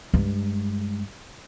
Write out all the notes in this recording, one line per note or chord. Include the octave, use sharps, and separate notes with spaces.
G2 G#3